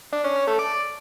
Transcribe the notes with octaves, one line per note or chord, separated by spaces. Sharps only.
D4
C#4
C#4
A3
D5